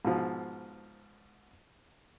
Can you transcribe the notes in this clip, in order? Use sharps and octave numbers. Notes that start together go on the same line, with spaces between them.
G#2 B2 F3